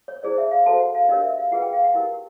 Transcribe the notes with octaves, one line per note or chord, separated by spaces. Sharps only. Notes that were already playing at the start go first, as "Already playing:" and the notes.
C#5
E4 G#4 C5 D5
E5
F5
F#4 A4 C5 A5
F#5
F5
D4 G4 A#4 C#5 D#5
E5
F5
F4 G#4 B4 F#5
G5
F5
F#5
E4 G4 A#4